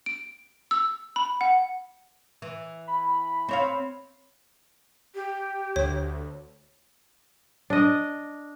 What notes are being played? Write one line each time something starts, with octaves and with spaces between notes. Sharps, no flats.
D7
E6
B5
F#5
E3
B5
C4 C#5 F5
G4
D2 C#5
D4 D#5